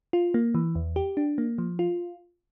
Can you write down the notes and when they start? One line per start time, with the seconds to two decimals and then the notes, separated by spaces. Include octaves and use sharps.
0.13 F4
0.34 A#3
0.54 E3
0.75 E2
0.96 G4
1.17 D4
1.38 A#3
1.58 F3
1.79 F4